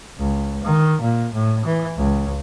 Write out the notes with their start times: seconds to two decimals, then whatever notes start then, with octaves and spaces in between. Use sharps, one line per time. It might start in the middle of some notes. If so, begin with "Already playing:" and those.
0.18 C#2
0.64 D#3
1.01 A#2
1.34 A2
1.66 E3
1.97 C#2